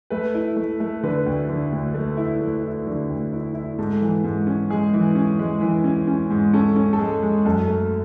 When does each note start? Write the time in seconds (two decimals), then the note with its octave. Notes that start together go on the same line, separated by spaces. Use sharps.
0.10 A3 B4
0.34 E4
0.56 A3
0.80 A3
1.03 D3 B4
1.26 D2
1.49 D3
1.72 D2
1.94 A3
2.17 E4
2.41 A3
2.63 E4
2.87 D3
3.09 D2
3.33 E4
3.55 E4
3.78 G#2 A4
4.01 E3
4.24 G#2
4.47 C#4
4.70 G#3 G#4
4.93 E3
5.15 C#4
5.39 G#3
5.61 E3
5.84 C#4
6.07 C#4
6.30 G#2
6.53 C#4 A4
6.76 C#4
6.93 A4
6.99 G#3 G#4
7.22 G#3
7.45 F#2 A4
7.68 A3